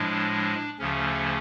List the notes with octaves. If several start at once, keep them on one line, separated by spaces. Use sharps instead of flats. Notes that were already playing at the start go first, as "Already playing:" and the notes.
Already playing: A2 F3 G#3 D4
D2 C#3 F3 A3 C#4